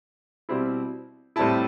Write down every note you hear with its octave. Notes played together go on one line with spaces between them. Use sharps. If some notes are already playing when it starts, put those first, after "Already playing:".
B2 G3 C4 E4
A2 G3 C4 E4 A5